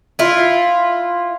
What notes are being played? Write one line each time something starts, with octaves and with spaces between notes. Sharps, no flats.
E4 F4